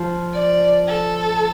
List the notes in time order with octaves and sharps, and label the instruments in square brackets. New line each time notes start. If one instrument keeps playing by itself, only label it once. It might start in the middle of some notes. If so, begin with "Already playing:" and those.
Already playing: [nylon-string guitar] F3
[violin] D5
A4